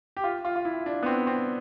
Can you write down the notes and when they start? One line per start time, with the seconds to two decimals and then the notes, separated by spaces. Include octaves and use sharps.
0.17 G4
0.24 F4
0.45 F4
0.55 F4
0.65 E4
0.86 D4
1.03 B3
1.06 C4
1.27 C4